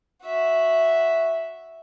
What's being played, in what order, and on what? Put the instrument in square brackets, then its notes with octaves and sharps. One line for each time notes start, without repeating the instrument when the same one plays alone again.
[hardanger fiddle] F#4 E5